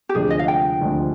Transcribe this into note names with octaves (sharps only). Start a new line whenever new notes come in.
G4
D2 C3 F3 G#3 D4 G#4
D#5
F5
G5
D2 C3 F3 G#3 D4